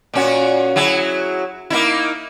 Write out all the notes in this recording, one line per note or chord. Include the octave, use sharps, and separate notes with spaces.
A#2 C#4 F#4
F#3 E4 G#4
A#3 D#4 E4